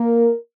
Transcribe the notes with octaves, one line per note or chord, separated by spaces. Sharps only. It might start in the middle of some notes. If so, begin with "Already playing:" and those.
Already playing: A#3 A#4